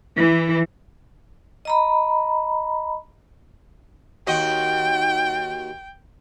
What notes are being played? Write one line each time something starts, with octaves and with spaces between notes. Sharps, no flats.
E3
D#5 A#5 B5
D#2 F#4 D#5 G5